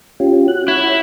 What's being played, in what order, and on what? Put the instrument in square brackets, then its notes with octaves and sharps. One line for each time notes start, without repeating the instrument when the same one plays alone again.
[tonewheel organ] C#4 F4 G4
F#4 F#6
[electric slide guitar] E4 [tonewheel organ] C#5 F#5